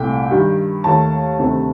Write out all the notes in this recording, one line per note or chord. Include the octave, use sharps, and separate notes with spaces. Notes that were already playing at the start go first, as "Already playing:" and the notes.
Already playing: C2 A#2 A3 G5
G2 D#3 G3
D#2 D#3 A3 A5
D2 C3 D#3 A3